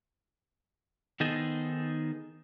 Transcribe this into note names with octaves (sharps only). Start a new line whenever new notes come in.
D#3 B3 D#4 G#4 A4 C5